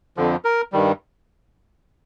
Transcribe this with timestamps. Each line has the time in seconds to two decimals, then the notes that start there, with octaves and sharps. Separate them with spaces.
0.17 F2 D3 F3
0.45 A#4
0.72 G2 D#3 G3